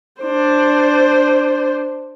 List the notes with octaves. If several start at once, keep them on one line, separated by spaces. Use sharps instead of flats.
D4 C5